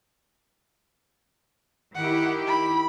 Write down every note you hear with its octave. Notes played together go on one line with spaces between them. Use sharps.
D#3 E4 G4 F#5
B5